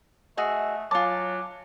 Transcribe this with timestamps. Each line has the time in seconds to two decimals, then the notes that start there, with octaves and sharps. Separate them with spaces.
0.37 A3 F#4 G#4 D#5 E5
0.91 F#3 F4 G#5 A5 D6